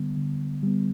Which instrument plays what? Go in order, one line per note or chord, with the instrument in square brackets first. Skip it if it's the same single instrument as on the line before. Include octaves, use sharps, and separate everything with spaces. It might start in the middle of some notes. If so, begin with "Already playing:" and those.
Already playing: [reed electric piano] D3 G3 B3
D3
G3 B3